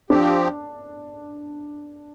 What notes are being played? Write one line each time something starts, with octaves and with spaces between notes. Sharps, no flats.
F3 C4 D4 G4